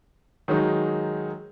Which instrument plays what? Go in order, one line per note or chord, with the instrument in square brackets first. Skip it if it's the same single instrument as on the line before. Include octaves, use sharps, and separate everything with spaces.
[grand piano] D#3 F#3 G#3 D#4